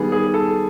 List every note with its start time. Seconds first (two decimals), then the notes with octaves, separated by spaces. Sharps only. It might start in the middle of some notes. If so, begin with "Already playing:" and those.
Already playing: D#3 G3 B3 G#4
0.12 G#4
0.34 A4